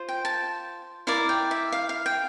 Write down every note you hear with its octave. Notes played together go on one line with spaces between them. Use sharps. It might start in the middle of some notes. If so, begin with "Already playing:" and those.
Already playing: F4 C5
G5
A5
E4 A#4 D5 F5
G5
E5
F5
F5
G5